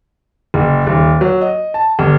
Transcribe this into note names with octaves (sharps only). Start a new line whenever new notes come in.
F#1
D#1
F#3
D#5
A5
G1